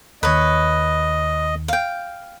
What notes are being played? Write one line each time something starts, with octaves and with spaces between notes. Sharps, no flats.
D#2 D#3 B4 C#5 D#5
F5 G5